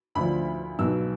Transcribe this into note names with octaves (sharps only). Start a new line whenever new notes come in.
D2 D3 F3 B5
B1 B2 E6